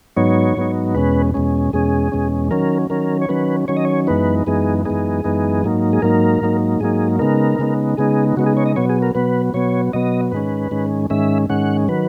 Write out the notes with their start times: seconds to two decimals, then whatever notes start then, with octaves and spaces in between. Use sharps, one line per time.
0.16 G#2 F#3 B3 D#4 C#5
0.57 G#2 F#3 B3 D#4
0.95 E2 B2 G#3 C#4 B4
1.34 E2 B2 G#3 C#4
1.73 E2 B2 G#3 C#4 G#4
2.12 E2 B2 G#3 C#4
2.51 D#3 F#3 C#4 A#4
2.90 D#3 F#3 C#4 A#4
3.22 C#5
3.29 D#3 F#3 C#4 B4
3.68 D#3 F#3 C#4 C#5
3.77 D#5
3.85 C#5
4.07 F#2 E3 G#3 B3 D#4 B4
4.47 F#2 E3 G#3 B3 D#4 G#4
4.85 F#2 E3 G#3 B3 D#4 G#4
5.24 F#2 E3 G#3 B3 D#4
5.64 G#2 F#3 A#3 D#4
5.93 G#4
6.02 G#2 F#3 A#3 D#4 A#4
6.41 G#2 F#3 A#3 D#4
6.80 G#2 F#3 A#3 D#4 G#4
7.19 C#3 G#3 B3 D#4 A#4
7.59 C#3 G#3 B3 D#4
7.97 C#3 G#3 B3 D#4 G#4
8.37 C#3 G#3 B3 D#4 F#4
8.46 G#4
8.57 C#5
8.66 D#5
8.76 B2 F#3 B3 C#5
8.89 G#4
9.02 A#4
9.15 B2 F#3 B3 B4
9.54 B2 F#3 B3 C#5
9.93 B2 F#3 B3 D#5
10.32 G#2 D#3 G#3 C#4 B4
10.71 G#2 D#3 G#3 C#4
11.10 G#2 D#3 G#3 C#4 E5
11.50 G#2 D#3 G#3 C#4 F#5
11.88 D#3 F#3 B4